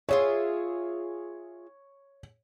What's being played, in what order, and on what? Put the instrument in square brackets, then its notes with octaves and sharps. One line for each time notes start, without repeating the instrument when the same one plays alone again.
[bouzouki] F4 G#4 E5 [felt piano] C#5